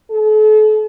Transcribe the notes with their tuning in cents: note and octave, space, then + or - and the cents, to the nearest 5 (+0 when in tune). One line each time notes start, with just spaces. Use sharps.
A4 -40